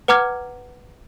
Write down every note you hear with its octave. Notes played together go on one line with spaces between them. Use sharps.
B4 F#5 A#5 D6 F6 G#6